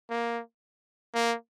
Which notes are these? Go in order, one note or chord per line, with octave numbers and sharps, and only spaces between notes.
A#3
A#3